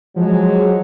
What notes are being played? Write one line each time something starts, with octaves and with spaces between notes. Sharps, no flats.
F3 F#3 G#3